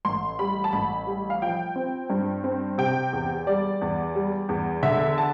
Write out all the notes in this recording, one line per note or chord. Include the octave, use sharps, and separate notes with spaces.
A1 C6
G3 B5
A5
A1 B5
G3
F5
F3 G5
C4
G2
C4
C3 G5
E2
G3 D5
E2
G3
E2
D3 E5
A5